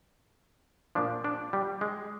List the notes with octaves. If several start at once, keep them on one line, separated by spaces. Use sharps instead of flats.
A#2 F3 D4
D4
G3
G#3